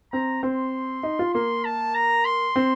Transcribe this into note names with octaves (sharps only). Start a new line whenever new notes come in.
C4 A#5
C4 C6
D#4
F4
A#3 C6
A5
A#5
C6
C4